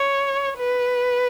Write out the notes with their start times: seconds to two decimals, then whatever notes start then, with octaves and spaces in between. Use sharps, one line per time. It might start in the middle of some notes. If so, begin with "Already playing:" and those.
Already playing: C#5
0.58 B4